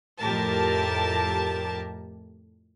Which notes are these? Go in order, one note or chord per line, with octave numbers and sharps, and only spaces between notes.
F2 A2 G4 A#4 A5